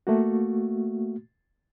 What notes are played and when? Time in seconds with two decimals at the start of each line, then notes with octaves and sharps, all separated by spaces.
0.07 A3 A#3 F#4